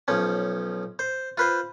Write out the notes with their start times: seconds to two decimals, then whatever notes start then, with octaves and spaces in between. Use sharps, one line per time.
0.08 B1 F3 C#4
0.99 C5
1.38 F4 B4 C5